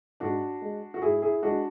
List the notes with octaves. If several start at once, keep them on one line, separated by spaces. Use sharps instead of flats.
G#2 D4 F#4
G#3
F#4
G#2 E4 G#4
E4 G#4
G#3 D4 F#4